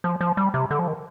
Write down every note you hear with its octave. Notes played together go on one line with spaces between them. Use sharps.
F3
F3
G3
C3
D3
F3
D#3